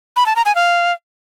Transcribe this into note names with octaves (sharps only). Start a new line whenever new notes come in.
B5
A5
A#5
G#5
F5